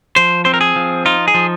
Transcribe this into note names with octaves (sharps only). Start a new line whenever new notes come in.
F3 C5
C4 C5
A#4
G#4
F3
D#4 F4
G#4
F3